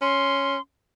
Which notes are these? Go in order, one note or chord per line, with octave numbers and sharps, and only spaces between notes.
C#4 C6